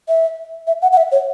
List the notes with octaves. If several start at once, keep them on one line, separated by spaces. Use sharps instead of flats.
E5
E5
F#5
F#5
E5
C#5